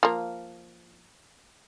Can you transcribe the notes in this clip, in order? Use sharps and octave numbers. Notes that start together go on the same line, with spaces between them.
F3 A#3